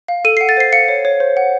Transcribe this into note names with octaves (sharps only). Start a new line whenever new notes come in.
F5
A4 D#7
C7
F#5
A6
C5 C7
F5 C#7
C#5
C#5
C5
F#5